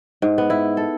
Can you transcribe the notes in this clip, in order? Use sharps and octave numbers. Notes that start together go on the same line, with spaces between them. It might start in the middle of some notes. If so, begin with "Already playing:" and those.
G#2
B3
E4
A4